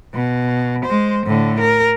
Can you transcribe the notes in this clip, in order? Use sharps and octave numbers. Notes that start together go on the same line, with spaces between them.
B2
G#3 C5
A2 D3
A#4